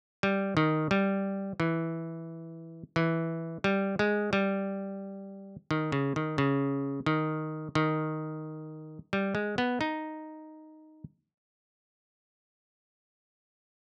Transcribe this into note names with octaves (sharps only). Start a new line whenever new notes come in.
G3
D#3
G3
E3
E3
G3
G#3
G3
D#3
C#3
D#3
C#3
D#3
D#3
G3
G#3
B3
D#4